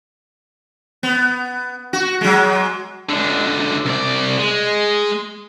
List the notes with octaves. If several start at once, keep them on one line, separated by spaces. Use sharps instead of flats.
B3
F#4
F#3 G#3
C#2 D3
C2 D5
G#3